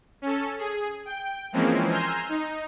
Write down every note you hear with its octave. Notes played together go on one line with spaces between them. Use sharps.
C#4 A4
G#4
G5
E3 F3 G#3 A#3 C4 C#4
G#5 A#5 C6 E6 F6 G6
D#4